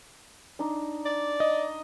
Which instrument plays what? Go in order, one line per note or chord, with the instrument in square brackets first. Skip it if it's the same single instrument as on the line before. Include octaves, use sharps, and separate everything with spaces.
[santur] D4 D#4
[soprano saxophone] D5
[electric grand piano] D#5